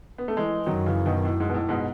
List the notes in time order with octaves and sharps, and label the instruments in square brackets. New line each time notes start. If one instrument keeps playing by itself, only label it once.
[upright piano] B3
A3
E3 G#3
[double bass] F#2 [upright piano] D#3 F#3
[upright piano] C#3 E3
B2 D#3
A2
G#2
B2
A2
G#2 B2